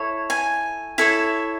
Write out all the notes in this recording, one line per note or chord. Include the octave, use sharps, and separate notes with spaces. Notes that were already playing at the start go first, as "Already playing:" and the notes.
Already playing: E4 A4 C#5
G#5
E4 A4 C#5 E5